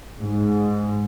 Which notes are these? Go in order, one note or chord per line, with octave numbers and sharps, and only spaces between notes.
G#2